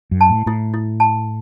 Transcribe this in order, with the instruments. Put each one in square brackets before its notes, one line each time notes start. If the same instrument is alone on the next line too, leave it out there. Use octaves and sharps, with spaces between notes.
[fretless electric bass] F#2
[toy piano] A5
[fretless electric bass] A2
[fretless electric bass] A2 [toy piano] E4
[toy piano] E4
A5